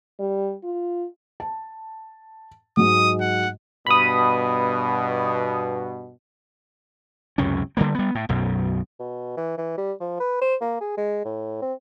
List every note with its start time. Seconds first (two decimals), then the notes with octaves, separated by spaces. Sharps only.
0.19 G3
0.63 F4
1.40 A5
2.77 G#2 F#3 G#3 D#6
3.20 F#5
3.86 G2 B2 B5 D#6
7.38 C#2 F#2 C3 C#4
7.77 D3 G3 A#3
7.95 G3 B3
8.15 A2
8.29 B1 F#2 B2
8.99 B2
9.37 E3
9.57 E3
9.77 G3
10.00 F3
10.20 B4
10.41 C5
10.61 A#3
10.81 G#4
10.97 G#3
11.25 A2
11.62 C4